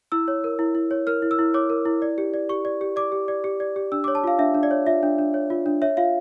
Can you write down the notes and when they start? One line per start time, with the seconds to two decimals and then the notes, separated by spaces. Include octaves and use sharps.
0.12 E4 E6
0.28 C#5
0.44 A#4
0.59 E4
0.75 E4
0.91 C#5
1.07 A#4 F6
1.22 E4
1.31 E6
1.39 E4
1.54 C#5 D6
1.70 A#4
1.85 E4
2.02 D5
2.18 G4
2.34 D5
2.49 G4 C#6
2.65 D5
2.81 G4
2.96 D5 D6
3.12 G4
3.28 D5
3.44 G4
3.60 D5
3.76 G4
3.92 D4 E6
4.04 D6
4.08 C#5
4.15 A5
4.24 F4 F5
4.39 D4 E5
4.54 D4
4.63 D5
4.71 C#5
4.87 F4 E5
5.03 D4
5.18 D4
5.34 C#5
5.50 F4
5.66 D4
5.82 C#5 E5
5.97 F4 F5